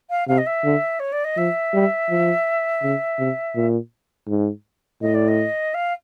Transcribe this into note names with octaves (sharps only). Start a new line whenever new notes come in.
F5
C3 F5
D#5
E5
D3
C#5
D5
D#5
F3 E5
G3
F3
C#3
C3
A#2
G#2
A2 D#5
D5
D#5
F5